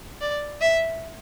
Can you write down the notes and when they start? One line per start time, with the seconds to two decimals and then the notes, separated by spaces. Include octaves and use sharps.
0.21 D5
0.61 E5